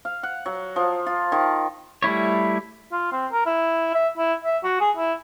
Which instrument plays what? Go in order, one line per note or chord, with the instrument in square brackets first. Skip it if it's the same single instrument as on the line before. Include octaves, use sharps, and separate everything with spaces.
[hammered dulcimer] F5
F#5
F#3
F3
F4
D#3
[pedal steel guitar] G3 A3 E4 C#5
[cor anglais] F4
C4
A#4
E4
E5
E4
E5
F#4
G#4
E4